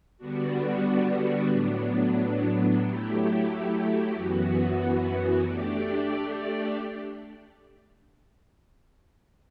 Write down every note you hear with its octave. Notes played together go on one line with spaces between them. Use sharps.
D3 G3 B3 D4 F#4
A2 F#3 B3 D4
F#3 A3 E4 G4
F#2 E3 B3 F#4
A3 D4 G4 D5